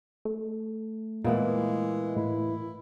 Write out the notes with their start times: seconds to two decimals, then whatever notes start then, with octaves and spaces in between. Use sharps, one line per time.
0.25 A3
1.24 A#2 E3 G#3 A#3 B3
2.16 A2 E4